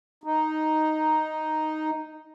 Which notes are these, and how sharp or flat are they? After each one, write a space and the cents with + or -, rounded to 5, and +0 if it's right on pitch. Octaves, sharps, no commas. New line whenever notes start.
D#4 +0